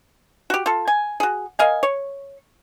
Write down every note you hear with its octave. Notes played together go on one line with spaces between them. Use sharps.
F#4 G4
F4 A4
G#5
F#4 G#4
A#4 D#5 F5 G#5
C#5